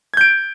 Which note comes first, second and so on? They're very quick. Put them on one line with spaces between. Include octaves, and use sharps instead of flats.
G#6 G6 D7